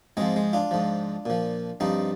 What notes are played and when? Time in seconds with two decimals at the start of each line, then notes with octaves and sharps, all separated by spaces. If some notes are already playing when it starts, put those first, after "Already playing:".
0.17 G#2 F3 G#3 C4
0.36 G#3
0.53 D4 F4
0.71 G#2 F3
1.26 A#2 F3
1.80 G2 F3 C4 D#4